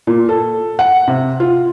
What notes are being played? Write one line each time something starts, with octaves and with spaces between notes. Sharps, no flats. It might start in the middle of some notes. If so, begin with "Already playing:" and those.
A#2
A4
F#5
C3
F4